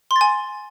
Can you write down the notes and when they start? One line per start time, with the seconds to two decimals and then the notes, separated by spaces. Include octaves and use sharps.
0.11 C6
0.16 A6
0.21 G#5